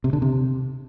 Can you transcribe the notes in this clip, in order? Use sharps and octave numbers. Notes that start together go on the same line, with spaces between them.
C3
D3
C3